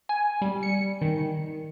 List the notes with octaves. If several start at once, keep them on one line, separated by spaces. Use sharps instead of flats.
G#5
G3
C#7
D#3